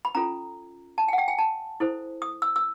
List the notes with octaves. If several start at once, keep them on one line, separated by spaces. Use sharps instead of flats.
B5
C#4 F4 A4 A#5
A5
G#5
F#5
G5
G#5
A5
E4 A4 C5
D#6
E6
E6